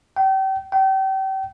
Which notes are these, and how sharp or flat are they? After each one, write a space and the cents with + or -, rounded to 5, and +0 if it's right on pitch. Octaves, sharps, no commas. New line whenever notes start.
G5 -35
G5 -35